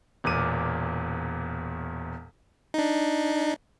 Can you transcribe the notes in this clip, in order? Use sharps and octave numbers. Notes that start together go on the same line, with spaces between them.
E1 E2 A#2 D6 D#7
D4 D#4